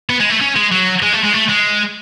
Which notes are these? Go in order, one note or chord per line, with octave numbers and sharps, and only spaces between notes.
B3
G#3
A3
C#4
G#3
F#3
G#3
A3
G#3
A3
G#3